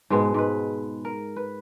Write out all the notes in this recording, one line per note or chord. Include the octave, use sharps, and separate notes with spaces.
G#2 B2 G#3 B3
G#2 B4
A#4
B4